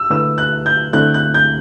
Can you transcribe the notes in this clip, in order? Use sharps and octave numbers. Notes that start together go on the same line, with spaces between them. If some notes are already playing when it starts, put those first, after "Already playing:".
Already playing: E6
D3 A3 E4 B4 E6
F#6
G6
D3 A3 C4 E4 F#6
F#6
G6